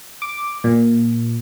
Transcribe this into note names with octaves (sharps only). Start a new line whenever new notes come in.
D6
A#2